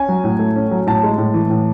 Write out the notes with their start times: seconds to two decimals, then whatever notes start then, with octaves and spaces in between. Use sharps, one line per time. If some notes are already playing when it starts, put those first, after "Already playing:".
Already playing: C#4 G#5
0.09 F#3
0.24 A2
0.39 A3
0.56 C#4
0.71 F#3
0.87 A2 A5
1.03 G#3
1.18 A2
1.34 E3
1.50 A2